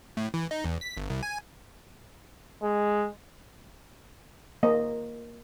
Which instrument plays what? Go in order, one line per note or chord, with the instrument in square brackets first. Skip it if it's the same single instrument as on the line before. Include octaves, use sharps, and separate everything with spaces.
[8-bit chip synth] A2
E3
D#4
E2
B6
G1
C2
G#5
[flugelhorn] G#3
[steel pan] A#3 C5 D#5